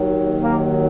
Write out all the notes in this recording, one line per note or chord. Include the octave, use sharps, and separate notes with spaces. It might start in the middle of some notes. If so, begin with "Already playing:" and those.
Already playing: D#2 D#3 F#3
A#3